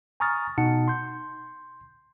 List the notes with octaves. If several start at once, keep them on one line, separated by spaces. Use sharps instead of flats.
G#5 A#5 C#6 D#6 F6 A6
B2 D#4 F#5 A5 C#7
C6 G6